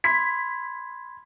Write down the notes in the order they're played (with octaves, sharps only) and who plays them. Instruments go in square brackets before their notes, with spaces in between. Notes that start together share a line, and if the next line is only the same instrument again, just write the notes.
[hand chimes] B5 C6 G#6 [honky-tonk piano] B6